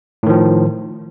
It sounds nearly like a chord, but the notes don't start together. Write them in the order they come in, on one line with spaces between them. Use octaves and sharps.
A2 D#3 F3